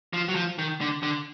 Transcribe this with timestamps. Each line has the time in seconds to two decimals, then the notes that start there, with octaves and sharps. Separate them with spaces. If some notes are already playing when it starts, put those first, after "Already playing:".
0.13 F3
0.29 F#3
0.36 F3
0.59 D#3
0.81 D3
1.03 D3